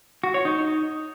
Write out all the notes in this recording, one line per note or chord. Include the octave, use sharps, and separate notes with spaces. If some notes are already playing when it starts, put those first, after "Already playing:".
F#4
C#5
D#4